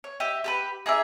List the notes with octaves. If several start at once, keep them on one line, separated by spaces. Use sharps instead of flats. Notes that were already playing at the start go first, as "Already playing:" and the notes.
C#5
G4 D#5 E5
G4 A4 B4
D#4 G#4 D5 E5